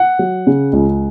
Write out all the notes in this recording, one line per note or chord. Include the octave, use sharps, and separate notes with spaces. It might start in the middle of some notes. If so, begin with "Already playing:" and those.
Already playing: F#5
F#3
C#3
C#2